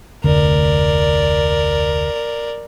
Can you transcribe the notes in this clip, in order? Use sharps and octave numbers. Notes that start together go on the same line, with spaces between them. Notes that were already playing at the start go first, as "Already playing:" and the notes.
F1 D2 D3 A#4 D5